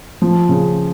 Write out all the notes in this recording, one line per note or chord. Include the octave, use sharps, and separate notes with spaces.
F3
C#3